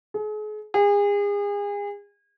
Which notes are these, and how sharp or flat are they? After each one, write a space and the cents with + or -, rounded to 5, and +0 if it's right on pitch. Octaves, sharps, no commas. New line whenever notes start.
G#4 +40
G#4 -35